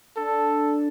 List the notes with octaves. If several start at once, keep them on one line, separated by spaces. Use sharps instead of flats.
D4 A4